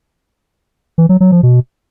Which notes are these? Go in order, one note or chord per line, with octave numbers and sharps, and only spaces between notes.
E3
F#3
F#3
F3
B2